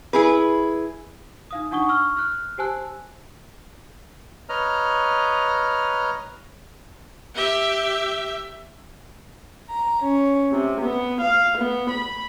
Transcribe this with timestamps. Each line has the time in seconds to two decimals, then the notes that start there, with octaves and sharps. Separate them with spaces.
0.13 E4 G#4 B4
1.51 D#4 F5 D#6
1.71 D4 D#4 F#5 C#6 D#6 G7
1.89 C#6 E6 F6
2.17 F6 F#6
2.58 G4 C5 G#5 A5 E6 F#6
4.49 B4 C#5 D#5 A#5 F6
7.35 G4 E5
9.69 A#5
10.03 C#4
10.52 C3
10.81 B3
11.22 F5
11.57 B3
11.90 B5